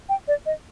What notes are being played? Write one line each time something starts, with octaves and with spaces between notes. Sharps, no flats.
G5
D5
D#5